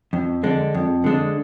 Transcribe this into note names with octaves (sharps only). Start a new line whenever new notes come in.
F2
D3 G#3 D4
F2
D3 G#3 D4